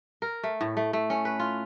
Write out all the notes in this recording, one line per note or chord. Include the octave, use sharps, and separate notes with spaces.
A#4
A3
A2
A3
A3
C#4
B4
F4